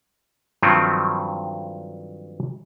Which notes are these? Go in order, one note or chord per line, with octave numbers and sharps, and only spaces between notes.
G2 D#3 F3 F#3 A3 C4